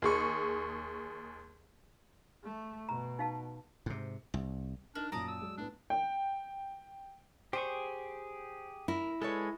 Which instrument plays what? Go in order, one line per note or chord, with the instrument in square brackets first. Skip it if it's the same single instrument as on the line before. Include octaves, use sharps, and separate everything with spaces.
[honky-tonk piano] D#2 G#4 C#6
[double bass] A3
[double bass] B2 [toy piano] A#5
[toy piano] D#4 F5 A5
[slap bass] G#2 C3
C2
[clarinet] D4 [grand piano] D#4 F#7 [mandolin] A#4
[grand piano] F#2 A#2 [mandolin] D5 A5 D#6 [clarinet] A#5
[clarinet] E6
[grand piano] F#3 G#3
[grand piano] A2 B3 [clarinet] D4
[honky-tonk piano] G5
[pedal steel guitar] G4 G#4 C#6 [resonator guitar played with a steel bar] C5
[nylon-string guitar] E4 [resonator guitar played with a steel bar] A#4
[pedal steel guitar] G#3 [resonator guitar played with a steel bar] A4 B4 C#5